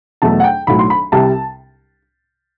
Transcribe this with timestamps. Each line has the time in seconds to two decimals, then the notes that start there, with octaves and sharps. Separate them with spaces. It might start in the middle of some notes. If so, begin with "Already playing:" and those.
0.22 E2 B2 F#3 A3 A5
0.40 F#5
0.44 G5
0.67 B1 A2 F#3 B5
0.79 C6
0.90 B5
1.12 C2 C3 G3 A5